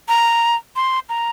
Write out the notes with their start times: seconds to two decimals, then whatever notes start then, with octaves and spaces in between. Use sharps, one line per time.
0.08 A#5
0.76 C6
1.09 A#5